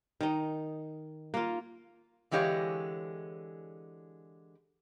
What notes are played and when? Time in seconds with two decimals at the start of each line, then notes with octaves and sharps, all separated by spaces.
0.21 D#3 D#4
1.34 A#3 F4
2.31 D3 E3 G#3 G4 C#5 F5